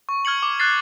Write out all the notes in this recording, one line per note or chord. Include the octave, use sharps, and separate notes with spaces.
C#6
F6 G#6 C#7 F#7
D6
F#6 A6 C7